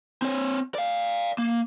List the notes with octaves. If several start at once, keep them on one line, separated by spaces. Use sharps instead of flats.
C4 C#5
D5 F5
A#3